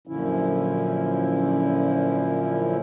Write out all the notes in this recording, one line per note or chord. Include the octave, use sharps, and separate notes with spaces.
F#2 A#2 D3 F3 C#4 E4